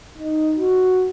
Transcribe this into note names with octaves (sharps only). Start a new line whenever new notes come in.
D#4
F#4